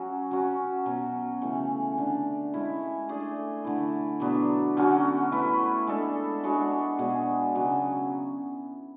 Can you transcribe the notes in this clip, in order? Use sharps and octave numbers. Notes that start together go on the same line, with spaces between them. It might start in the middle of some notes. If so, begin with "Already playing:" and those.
Already playing: F#3 C#4 F#4
F#3 C#4 F#4
B2 F#3 C#4
C#3 E3 A3
D3 A3 D4
G#3 C#4 E4
A3 D4 G#4
D3 A3 E4
B2 F#3 B3 D4
D3 F#3 C#4 F#4
A3 E4 B4
G#3 D4 A4
G#3 D4 F#4 C#5
B2 G#3 D4 G#4
C#3 F#3 B3